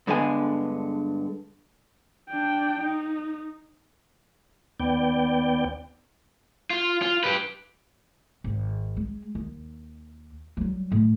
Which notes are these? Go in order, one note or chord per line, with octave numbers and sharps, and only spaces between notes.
G2 D3 G#3 B3 G#5
D4 G5
D#4
D#2 B3 D5 G5
F4
F4
G4 B4
G#1
G#3
D#2
F#3 G3
A2